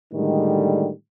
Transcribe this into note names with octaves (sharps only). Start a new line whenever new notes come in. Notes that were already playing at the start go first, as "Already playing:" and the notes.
A2 D3 D#3 G3 G#3